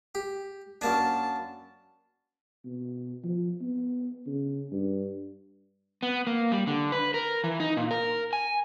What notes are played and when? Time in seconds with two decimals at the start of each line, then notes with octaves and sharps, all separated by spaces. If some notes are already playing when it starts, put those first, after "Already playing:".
0.15 G4
0.81 F#2 A#3 D4 A5
2.65 B2
3.23 F3
3.61 B3
4.26 C#3
4.72 G2
6.03 B3
6.27 A#3
6.52 G3
6.67 D3
6.92 B4
7.14 A#4
7.44 E3
7.60 D#4
7.77 A#2
7.91 A#4
8.33 G#5